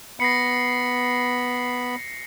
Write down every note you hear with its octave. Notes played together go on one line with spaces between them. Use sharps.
B3 B5 A#6 C7 C#7